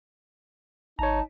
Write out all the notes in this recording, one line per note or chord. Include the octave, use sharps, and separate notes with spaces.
G#1 D#4 C#5 A5 A#5